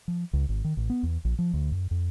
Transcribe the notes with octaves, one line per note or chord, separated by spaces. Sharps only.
F3
C#2
G#1
D#3
A1
B3
E2
A#1
F3
D2
F#2
F2